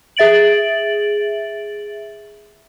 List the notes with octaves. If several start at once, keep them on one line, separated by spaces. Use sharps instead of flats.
G#4 E5 A6 D7 F#7